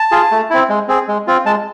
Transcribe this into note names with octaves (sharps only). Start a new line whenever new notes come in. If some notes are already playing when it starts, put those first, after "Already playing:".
Already playing: A5
F4 G#4
A3
C4 E4
G#3
C4 G#4
G#3
C4 F4
G#3 A5